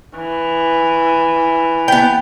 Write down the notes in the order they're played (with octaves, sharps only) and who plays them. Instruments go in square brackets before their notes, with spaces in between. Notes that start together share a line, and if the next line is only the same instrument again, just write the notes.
[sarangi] E3
[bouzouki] B3 G5